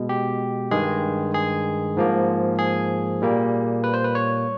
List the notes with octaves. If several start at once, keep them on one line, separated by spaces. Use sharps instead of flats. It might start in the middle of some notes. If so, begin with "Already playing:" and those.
Already playing: B2 G#3
G4
G2 D#3 G#3 G#4
G#4
G#2 F3 A#3
G#4
A#2 G3 A#3
B4
C5
B4
C#5